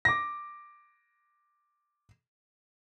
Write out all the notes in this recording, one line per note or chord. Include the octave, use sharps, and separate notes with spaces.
D6 A#6